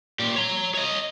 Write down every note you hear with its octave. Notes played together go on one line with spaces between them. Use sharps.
A#2 G4
C#5 A#5
C#5 D#5